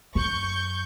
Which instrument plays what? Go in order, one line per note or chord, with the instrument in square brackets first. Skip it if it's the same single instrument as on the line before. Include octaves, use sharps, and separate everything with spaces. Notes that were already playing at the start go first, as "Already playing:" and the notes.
[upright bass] F#2 [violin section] C#6 G6